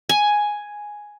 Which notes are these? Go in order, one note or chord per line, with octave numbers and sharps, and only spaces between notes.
G#5